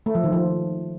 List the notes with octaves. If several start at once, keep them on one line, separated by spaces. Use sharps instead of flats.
A3
F3
D#3
F3